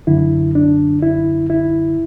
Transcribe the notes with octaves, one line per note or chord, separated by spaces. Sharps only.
F#2 D3 E4
D4
E4
E4